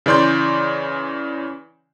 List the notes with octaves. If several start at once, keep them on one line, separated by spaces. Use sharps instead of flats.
C#3 E3 D5 C6 G6